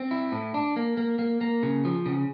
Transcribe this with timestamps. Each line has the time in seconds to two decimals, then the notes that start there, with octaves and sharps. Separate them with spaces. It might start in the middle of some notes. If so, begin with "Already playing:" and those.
Already playing: C4
0.11 E4
0.32 A2
0.54 D4
0.76 A#3
0.97 A#3
1.19 A#3
1.41 A#3
1.63 C#3
1.85 F3
2.06 C#3